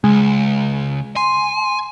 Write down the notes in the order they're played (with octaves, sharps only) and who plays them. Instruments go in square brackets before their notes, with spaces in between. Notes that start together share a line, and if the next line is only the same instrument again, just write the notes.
[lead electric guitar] C#2 [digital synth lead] G#3
[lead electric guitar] G#5 [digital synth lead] C6